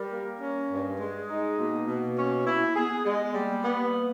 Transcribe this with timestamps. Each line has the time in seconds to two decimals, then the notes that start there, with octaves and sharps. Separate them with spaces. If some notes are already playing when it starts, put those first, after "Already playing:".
Already playing: G3 A#4
0.11 A#3
0.41 C#4
0.71 G2
1.00 G#3 G#4
1.29 D#4
1.58 B2 A#3
1.88 B2
2.17 C#4
2.47 E4
2.75 B3 G#4
3.06 G#3
3.34 G3 A#3
3.64 B3